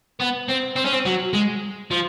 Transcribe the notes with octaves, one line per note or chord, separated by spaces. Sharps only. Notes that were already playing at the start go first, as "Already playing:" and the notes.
B3
C4
C4
C#4
C4
F#3
G#3
F3